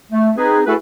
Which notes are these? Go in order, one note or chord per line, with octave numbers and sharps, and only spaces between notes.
A3
C4 D#4 G#4 B4
A3 E4 F#4 G#4 A4 B4